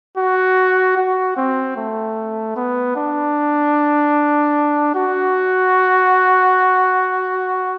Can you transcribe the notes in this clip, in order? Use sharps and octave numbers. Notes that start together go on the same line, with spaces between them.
F#4
F#4
C4
A3
B3
D4
F#4